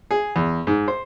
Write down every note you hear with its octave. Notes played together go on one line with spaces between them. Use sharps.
G#4
E2
G#2
C5